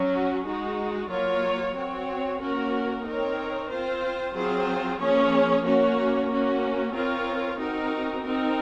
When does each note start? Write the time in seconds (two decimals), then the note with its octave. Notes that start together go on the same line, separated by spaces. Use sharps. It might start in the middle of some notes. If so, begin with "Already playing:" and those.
Already playing: F#3 C#4 F#4
0.46 G#3 D#4 F#4
1.10 F#3 A#3 F4 A#4 C#5
1.75 C4 F#4 C#5
2.40 A#3 C#4 F#4 A#4
3.04 C4 D#4 A#4 C#5
3.69 C4 F4 C5
4.34 F#3 C4 F4 G#4 C5
4.99 F3 A#3 C#4 G#4 C#5
5.64 A#3 C#4 F#4 C#5
6.29 A#3 C#4 F#4
6.94 C4 F4 A#4 C#5
7.59 C4 D#4 F#4 A#4
8.24 C4 D#4 A#4